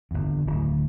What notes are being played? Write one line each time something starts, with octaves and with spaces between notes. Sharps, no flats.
G1 E2
D1